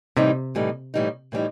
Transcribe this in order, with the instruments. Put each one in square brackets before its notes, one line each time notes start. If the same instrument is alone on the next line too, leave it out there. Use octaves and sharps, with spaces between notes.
[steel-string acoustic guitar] A2 E3 G3 D#4 [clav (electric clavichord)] C3
[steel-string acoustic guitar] A2 E3 G3 D#4
A2 E3 G3 D#4
A2 E3 G3 D#4